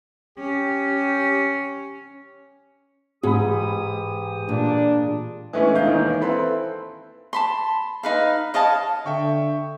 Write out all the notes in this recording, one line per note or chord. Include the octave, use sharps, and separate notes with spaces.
C#4 G4
G#2 E3 G#3 G4 B5 D#6
A#2 D4
E3 G#3 A3 B3 C#4
G#2 A3 D#5 F5 G6
D#2 D#3 E3
C4 E4 A4 B4 B5 C6
A5 B5 C6
D#4 B4 F5
C#5 D#5 F5 A5
D3 E5 G5 C#6